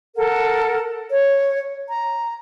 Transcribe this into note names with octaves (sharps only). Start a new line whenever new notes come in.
A4 A#4 F#5
C#5
A#5